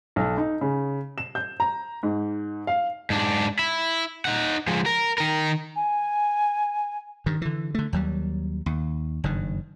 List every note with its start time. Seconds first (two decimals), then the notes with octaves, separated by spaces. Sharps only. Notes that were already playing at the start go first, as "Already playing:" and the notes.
0.16 B1
0.38 D#4
0.61 C#3
1.18 E7
1.35 G6
1.60 A#5
2.03 G#2
2.67 F5
3.10 G#2 D4
3.59 E4
4.25 D#4 F#5
4.67 F3 G#3
4.86 A#4
5.18 D#3 A#4
5.76 G#5
7.26 G2 D#3
7.42 D3 E3
7.75 D3 A3
7.93 D#2 F#3 G3
8.66 D#2
9.24 F#1 G2 D#3